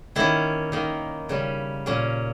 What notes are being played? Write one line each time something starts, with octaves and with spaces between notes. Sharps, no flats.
D#3 A#3 C#4 E4
D#3 A#3 D#4
C#3 G3 C#4
A#2 A#3 C#4